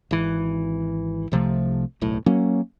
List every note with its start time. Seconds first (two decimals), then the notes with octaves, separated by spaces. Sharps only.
0.11 G#1 E3
1.32 C2 C3 F3 A3
2.01 D1 B1 A2
2.26 F#3 A#3 C#4